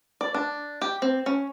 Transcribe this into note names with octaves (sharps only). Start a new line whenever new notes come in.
D5
D4
G4
C4
C#4